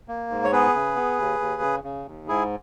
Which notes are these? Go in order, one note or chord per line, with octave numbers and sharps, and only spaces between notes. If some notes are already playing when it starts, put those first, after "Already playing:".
A#3
G#2
C#5
B3 G#4 B4
C#3
B3
D#2
D#2
C#3
C#3
D#2
G#2 E4 G#4